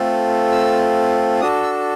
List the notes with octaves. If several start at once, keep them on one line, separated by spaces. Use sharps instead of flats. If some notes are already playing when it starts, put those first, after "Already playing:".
Already playing: A3 C4 F4 A4
E6
D4 F#4 A4 D#6
E6